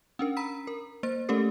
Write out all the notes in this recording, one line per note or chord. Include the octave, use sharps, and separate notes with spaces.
C#4 D4 A#4
A#5 B5 E6 B6
A#4
A#3 C5 A6
A3 C#4 G4 A4 A#4